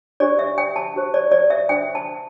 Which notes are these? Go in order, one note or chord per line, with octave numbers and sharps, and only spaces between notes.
D4 G4 C5 D5
E5
G5
A5
D4 G4 C5
D5
D5
E5
D4 C5 G5
A5